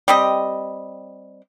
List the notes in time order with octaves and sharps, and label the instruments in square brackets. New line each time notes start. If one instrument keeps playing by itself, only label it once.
[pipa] G3 C4 G4 D#5